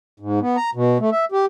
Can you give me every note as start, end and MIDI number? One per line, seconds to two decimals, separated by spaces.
0.20 0.40 44
0.41 0.57 59
0.57 0.70 82
0.75 0.98 47
1.00 1.10 57
1.12 1.25 76
1.32 1.46 67